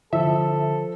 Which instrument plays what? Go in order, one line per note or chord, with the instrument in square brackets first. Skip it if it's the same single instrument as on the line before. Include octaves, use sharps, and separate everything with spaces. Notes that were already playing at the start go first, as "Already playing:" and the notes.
[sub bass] D3 [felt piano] F3 [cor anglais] A4 [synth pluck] E5